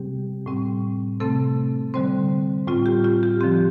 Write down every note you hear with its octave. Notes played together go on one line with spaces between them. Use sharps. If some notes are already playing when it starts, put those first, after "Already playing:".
Already playing: C3 G3 C4 G4
A2 G3 C4
C3 A3 C4 A4
D3 G3 C4 C5
A2 G3 C4 F4
G4
F4
G4
D3 F3 C4 G4